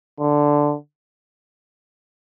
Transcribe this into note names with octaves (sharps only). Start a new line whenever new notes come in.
D3